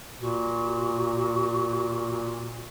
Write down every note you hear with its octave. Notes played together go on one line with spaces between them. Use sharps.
A#2 F#4